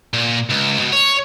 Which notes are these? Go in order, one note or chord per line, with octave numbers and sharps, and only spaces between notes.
A#2
C#2
B2
C#5